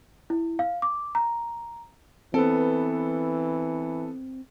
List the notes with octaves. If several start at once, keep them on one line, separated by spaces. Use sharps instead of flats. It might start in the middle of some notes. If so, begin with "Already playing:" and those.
E4
F5
D6
A#5
E3 B3 C4 A4